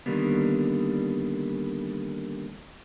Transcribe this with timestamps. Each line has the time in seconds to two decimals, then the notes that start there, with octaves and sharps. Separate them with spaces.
0.06 D3 D#3 G3 A#3 B3